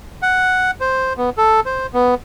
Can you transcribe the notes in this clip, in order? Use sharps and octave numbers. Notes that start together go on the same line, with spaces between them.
F#5
C5
B3
A4
C5
B3